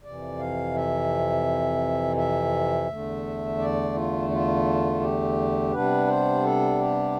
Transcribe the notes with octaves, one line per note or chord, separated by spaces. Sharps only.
F2 C3 E3 D5
F5
E5
E5
E2 D3 A3
D5
F4
F4
G4
C3 G3 B3 D4 B4
C5
A4
G4